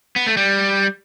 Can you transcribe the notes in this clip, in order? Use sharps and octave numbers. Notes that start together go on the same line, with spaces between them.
B3
A3
G3